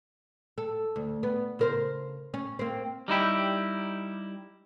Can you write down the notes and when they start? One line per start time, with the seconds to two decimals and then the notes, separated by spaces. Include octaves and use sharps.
0.58 A4
0.96 D2
1.23 B3
1.59 C#3 A#4 C5
2.34 C#4
2.59 A#3 C4
3.08 G3 D#4 E4 G4